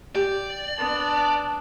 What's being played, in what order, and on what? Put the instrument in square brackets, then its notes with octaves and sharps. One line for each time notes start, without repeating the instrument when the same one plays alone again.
[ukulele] G4 [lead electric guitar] D5
[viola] B3 D4 [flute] A5